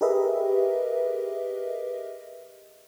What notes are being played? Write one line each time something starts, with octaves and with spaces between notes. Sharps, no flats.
G4 G#4 A#4 B4 D#5 E5